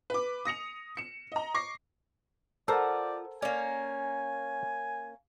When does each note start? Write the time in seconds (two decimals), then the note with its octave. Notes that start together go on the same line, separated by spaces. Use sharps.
0.10 B4 D6
0.45 D#6 A#6 C#7 F7
0.97 C#7 E7
1.32 D#5 A#5
1.55 C#6 D6 A#6 C7
2.68 F3 A4 A#4 C5 D5 F#5
3.42 A#3 C#4 D5 G#5